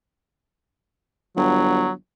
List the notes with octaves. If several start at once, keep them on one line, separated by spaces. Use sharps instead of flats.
G1 F#3